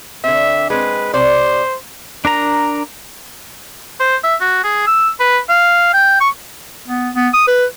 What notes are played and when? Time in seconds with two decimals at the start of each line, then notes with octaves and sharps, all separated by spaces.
0.24 D3 C4 E5
0.70 G#3 C4 B4
1.13 C3 C5 D5
2.25 D4 A#4 A#5
4.00 C5
4.24 E5
4.41 F#4
4.64 G#4
4.87 E6
5.20 B4
5.49 F5
5.94 G5
6.21 C#6
6.88 B3
7.16 B3
7.34 D#6
7.48 B4